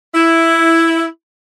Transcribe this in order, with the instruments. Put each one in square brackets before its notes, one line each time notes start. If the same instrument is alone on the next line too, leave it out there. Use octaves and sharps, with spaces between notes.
[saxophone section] E4